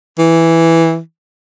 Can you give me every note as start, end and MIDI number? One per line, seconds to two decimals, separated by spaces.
0.18 0.98 52